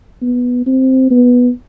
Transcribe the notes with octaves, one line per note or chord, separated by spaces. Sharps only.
B3
C4
B3